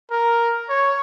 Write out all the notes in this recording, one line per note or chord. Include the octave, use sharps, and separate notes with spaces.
A#4
C#5